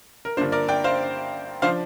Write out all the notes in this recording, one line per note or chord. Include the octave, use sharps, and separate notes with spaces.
A#4
G2 D3 A#3 D4 F4 C5
A#4 D5
D5 G5
C5 F5
F3 D4 C5 F5